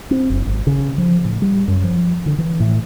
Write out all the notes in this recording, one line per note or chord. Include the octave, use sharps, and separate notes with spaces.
C4
F#1
G#1
C#3
F3
A2
G3
F#2
F3
D3
E3
A2